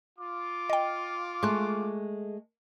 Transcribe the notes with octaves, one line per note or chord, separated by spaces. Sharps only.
F4 D6
D#5 G5
G#3 A3 C6 C#6 F#6